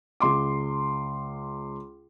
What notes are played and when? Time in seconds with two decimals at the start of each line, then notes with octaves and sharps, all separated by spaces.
0.20 C#2 C6 D6